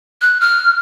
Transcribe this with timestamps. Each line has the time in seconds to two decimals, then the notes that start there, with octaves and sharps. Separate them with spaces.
0.22 F#6
0.41 F6